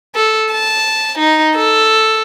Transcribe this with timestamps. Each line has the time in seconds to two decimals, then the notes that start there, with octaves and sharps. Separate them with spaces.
0.15 A4
0.52 A5
1.18 D#4
1.55 A4